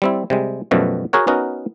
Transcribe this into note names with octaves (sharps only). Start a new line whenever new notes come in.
G3 C4 E4
C3 G3 G#3
F#2 B2 F3 G3 A3
F#4 G#4 A#4 C#5 F#5
B3 C#4 D#4 F#4 A#4